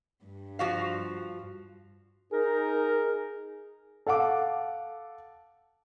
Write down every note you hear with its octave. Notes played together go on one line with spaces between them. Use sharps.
G2
F3 F#4 F5
D#4 G#4 A#4
A4 F5 F#5 D6